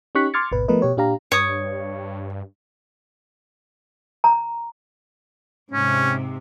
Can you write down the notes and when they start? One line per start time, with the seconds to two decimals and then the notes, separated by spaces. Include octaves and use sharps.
0.15 C#4 D#4 G4 C#6 F#6 B6
0.34 C6 D6 F6 G#6 A6 C#7
0.52 G#1 D#2 B2 B4
0.68 F3 A3 B3 A#4 B4 D#5
0.82 B2 G4 C#5
0.97 A#2 D4 G4 F5 A#5
1.32 G2 C#5 D#6
4.24 A#5
5.71 G#2 C3 C#4